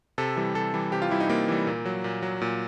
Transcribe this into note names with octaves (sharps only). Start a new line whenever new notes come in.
C3 A4
E3 G3
C3 A4
E3 G3
C3 G4
F4
E3 G3 E4
D#4
C3 A#3
E3 G3
A#2
F#3
A#2
F#3
A#2